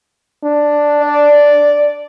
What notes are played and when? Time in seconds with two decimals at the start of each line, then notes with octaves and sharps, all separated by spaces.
0.43 D4
1.02 D5